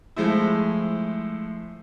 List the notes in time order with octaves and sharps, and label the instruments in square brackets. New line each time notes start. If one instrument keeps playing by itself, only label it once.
[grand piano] F3 G#3 A3 E4